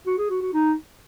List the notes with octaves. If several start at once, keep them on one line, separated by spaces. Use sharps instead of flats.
F#4
G#4
F#4
F#4
D#4